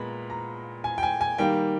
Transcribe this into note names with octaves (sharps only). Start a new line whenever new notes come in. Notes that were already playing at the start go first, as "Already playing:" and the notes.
Already playing: A#2 G#3 B3 A#5 B5
A#5
G#5
G5
G#5
G#5
D#3 G3 A#3 G5